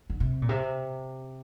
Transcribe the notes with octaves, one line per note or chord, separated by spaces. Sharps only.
D3
C3
A#2
C3